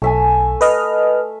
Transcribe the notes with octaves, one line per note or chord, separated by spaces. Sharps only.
B1 A3 E5 G#5
B4 D#5 F6